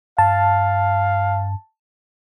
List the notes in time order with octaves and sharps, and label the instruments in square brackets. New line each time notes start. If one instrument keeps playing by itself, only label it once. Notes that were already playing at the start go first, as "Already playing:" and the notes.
[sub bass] G2 [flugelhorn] F5 [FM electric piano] A5